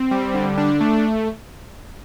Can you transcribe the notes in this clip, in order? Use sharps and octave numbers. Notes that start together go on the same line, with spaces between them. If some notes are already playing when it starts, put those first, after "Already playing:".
Already playing: C4
G3
D3
D4
A3